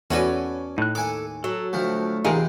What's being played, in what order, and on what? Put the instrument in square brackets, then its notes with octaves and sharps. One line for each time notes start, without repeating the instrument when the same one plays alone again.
[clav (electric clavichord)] E2 [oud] C#4 F#4 B4 [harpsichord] A4 D5
[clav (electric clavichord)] A2 [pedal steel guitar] D#4 F#6
[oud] D#2 [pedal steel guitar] A4 [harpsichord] F#5 G#5 D6
[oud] F#3 [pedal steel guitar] A4
[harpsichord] D2 F3 [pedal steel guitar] A3
[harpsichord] E2 C3 [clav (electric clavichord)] D#4 G#4 A#4 [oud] F4